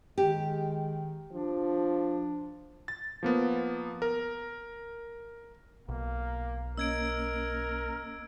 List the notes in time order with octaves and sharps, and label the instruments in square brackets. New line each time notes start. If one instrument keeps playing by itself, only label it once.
[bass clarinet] D#3 [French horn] G#3 [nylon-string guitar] G4
[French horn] F3 [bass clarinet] D4
[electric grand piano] A6
F3 A#3 B3
A#4
[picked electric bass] B1 [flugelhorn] A#3
[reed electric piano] A#3 C#4 D#5 [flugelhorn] A#4 [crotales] E6 G#6 D7